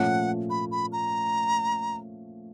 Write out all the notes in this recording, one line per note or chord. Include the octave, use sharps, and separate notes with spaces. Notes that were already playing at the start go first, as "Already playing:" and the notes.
Already playing: A#2 F3 A3 C#4 F#5
B5
B5
A#5